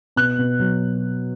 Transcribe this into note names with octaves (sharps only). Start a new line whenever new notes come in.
B2 F#6
B2
F#3